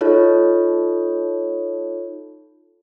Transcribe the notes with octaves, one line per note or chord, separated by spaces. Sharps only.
D#4 F4 A4 C#5